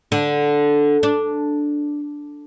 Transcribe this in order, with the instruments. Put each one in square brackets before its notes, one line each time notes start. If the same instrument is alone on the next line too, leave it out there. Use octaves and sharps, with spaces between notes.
[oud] D3
D4